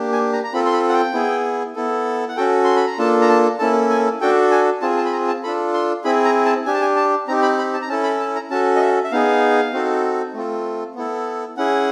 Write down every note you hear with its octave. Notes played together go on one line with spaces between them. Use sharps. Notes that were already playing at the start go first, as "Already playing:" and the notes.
Already playing: A#3 D4 G4
G#5
A#5
A#5
C4 F4 A4 B5
C6
B5
F#5
G5
B3 E4 G#4
B3 E4 A4
F#5
C#4 F#4 A4 G5
C6
B5
A#5
A#3 D4 F4 A4 A5
A#5
A5
A#3 C#4 E4 A4 A5
G#5
D4 F#4 A4 G5
G#5
C4 F4 G#4 A5
A5
B5
A#5
A5
D4 F4 A4 B5
C6
C4 E4 G#4 B5
A#5
A5
D4 G4 G#5
A5
G#5
A5
C4 D#4 G4 A#5
B5
B5
A5
A#5
C#4 E4 A4 A5
B5
A5
A#5
C#4 F#4 A4 A5
D#5
E5
E5
B3 D#4 G#4 F5
C4 D#4 F#4 A4
A3 C4 F4 A4
B3 E4 A4
C#4 E4 G#4 F#5